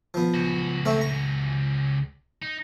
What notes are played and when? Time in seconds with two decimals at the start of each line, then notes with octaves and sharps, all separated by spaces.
0.14 F3 B3
0.34 C#2 F#4
0.85 A3 C4 C#6
1.01 A#5
2.42 D#4